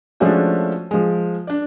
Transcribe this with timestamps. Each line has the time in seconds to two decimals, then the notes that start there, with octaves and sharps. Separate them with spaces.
0.20 F3 G#3 A3 C#4 D4 F#4
0.91 F3 G#3
1.47 D4 D5